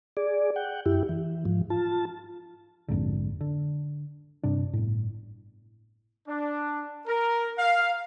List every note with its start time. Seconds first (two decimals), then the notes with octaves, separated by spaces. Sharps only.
0.17 G#4 D5
0.56 F#5 G5
0.86 F#2 E4 G4
1.09 E3
1.45 G#2 F3
1.70 F4 A5
2.88 A#1 F2 G#2 D3
3.41 D3
4.43 G2 C3 D4
4.73 G1 A2
6.27 D4
7.07 A#4
7.58 F5